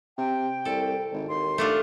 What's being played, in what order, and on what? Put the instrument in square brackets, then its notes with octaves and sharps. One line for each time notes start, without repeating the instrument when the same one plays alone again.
[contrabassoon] C3 [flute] G5
[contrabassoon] C2 [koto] A4
[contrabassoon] G#1
[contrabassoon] D#2 [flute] C6
[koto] A3 D4 F4